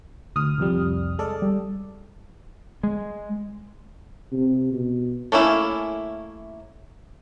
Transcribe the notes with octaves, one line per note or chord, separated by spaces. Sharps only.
D2 D#6 F6
C2 F2 G3
G#3 A4 D5
G3
G#3
C3
B2
A3 A#3 C#4 E4